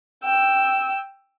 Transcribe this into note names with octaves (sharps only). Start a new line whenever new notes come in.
G5 E6